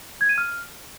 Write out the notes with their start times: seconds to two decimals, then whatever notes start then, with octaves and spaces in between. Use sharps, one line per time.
0.21 G#6
0.29 D#7
0.38 F6